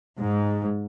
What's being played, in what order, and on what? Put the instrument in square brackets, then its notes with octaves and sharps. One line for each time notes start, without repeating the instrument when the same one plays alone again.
[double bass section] G#2